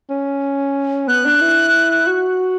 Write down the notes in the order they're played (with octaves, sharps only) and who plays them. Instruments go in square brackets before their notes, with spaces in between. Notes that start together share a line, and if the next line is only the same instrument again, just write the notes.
[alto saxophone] C#4
[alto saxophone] B3 [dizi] F#6
[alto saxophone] D4
E4
F#4